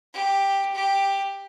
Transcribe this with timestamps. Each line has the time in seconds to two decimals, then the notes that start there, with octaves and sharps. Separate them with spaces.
0.13 G4
0.75 G4